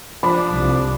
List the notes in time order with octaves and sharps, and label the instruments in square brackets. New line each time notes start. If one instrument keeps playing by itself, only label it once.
[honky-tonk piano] F3 [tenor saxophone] D4 [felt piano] B5
[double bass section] C2